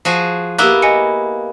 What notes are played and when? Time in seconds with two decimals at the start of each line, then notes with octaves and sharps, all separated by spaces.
0.05 F3 F#4 G#4
0.58 A#3 B3 E4 G4 E6 F#6
0.82 D#5 G#5 C#7